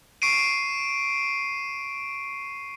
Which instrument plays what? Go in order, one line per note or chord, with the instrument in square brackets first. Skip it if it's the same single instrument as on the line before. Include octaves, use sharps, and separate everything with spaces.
[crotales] C#6 C7 D7 D#7